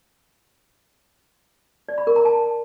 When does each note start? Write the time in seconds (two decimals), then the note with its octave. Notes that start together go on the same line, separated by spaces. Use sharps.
1.89 D5
1.98 B5
2.07 A#4
2.16 A#5
2.25 A5